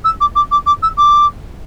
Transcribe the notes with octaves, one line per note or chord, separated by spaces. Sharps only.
E6
D6
D6
D6
D6
E6
D6